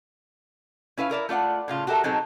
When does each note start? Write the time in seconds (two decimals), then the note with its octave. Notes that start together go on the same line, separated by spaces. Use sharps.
0.98 C#4 E4 B4 F5
1.09 E4 A#4 D5 E5
1.29 A3 F4 D5 F#5
1.68 A2 C#3 F4
1.87 F#4 G4 A4 A#4 E5
2.04 B2 F#3 C4 D#4 G#4 A4